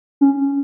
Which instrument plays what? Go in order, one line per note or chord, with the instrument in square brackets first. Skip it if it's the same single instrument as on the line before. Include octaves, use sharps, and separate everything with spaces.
[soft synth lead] C#4